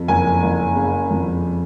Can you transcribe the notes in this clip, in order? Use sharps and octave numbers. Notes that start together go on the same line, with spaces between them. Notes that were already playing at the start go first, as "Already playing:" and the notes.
Already playing: F2
F#1 G#5
F#1
C#3
F2